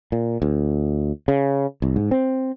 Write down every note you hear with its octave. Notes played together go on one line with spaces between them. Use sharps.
A#2
D2
C#3
C2
G#2
C4